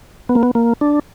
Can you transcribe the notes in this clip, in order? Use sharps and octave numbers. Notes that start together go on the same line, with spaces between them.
B3
A#3
B3
A#3
D4